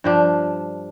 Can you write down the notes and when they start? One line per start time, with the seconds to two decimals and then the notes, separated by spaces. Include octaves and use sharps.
0.04 G2 F3 D4